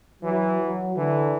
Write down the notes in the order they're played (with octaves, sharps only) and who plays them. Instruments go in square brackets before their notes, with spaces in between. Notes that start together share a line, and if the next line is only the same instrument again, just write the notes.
[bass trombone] E3 [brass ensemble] F#3
[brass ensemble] F#3
[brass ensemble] D3 [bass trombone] E3